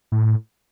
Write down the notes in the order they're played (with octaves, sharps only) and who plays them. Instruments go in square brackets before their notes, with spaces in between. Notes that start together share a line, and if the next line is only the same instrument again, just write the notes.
[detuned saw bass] A2